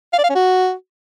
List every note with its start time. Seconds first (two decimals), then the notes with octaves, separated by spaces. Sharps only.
0.13 F5
0.19 D5
0.24 F5
0.30 C#4
0.35 F#4